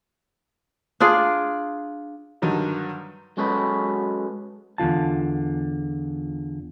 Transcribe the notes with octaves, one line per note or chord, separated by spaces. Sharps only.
D4 F4 G#4 D5
G2 D3 D#3 F#3 G3
F#3 G#3 C#4 F#4 A4 B4
E2 D3 F4 A5